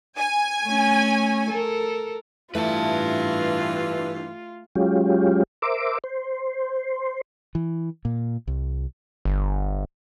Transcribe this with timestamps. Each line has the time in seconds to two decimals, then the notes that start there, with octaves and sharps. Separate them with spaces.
0.18 G#5
0.64 A3 C#4
1.50 A4 A#4
2.55 G2 E3 A3 F4 B4 A5
4.75 F#3 G#3 C#4 F4 G4
5.62 A#4 C5 E5 D6
6.04 C5
7.55 E3
8.05 A#2
8.47 C2
9.25 G1